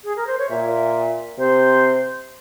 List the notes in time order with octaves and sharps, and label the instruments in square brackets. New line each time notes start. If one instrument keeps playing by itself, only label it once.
[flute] G#4
A#4
C5
C#5
[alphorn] A#2 [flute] E5
[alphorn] C3 [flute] C5